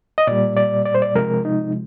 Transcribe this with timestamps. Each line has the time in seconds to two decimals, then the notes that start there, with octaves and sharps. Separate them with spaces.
0.18 D#5
0.27 A#2 G3 D5
0.57 D5
0.86 D5
0.95 C5
1.02 D5
1.15 C3 F3 G#3 A#4
1.45 D#4